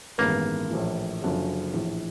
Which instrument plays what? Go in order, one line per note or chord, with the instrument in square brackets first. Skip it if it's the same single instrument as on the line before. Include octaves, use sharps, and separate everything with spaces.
[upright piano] A1 G2 D#3 G#3 B3 [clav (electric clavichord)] A#3
[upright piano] A#1 A2 E3
F#1 F#2 D3 F3
A#1 A2 E3